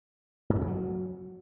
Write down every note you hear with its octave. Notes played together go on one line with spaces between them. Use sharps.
G#2
F2
C#3
F#3